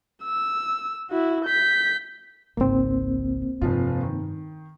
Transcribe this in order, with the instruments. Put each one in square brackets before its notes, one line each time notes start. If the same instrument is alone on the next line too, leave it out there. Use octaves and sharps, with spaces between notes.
[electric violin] E6
E4 F#4
G6 B6
[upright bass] G#1 C#2 [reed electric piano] A#3 C4
[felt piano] F1 F3 F4 [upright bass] G2
[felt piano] D#3